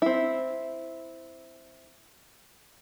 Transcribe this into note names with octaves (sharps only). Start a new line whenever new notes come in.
C4 E4